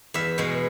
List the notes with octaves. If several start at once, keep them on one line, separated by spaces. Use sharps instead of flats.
E2 E5
B2 G#3